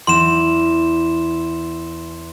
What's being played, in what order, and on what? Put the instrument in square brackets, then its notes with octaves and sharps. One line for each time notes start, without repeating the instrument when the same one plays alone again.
[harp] E2 [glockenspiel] C6 E7